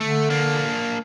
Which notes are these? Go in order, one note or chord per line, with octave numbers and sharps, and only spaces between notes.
D3 A3
A#3 D4